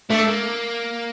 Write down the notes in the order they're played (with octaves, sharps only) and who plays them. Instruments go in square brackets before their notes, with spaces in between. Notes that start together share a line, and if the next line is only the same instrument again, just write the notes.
[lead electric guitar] A3 [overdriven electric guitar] D4
[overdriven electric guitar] A#3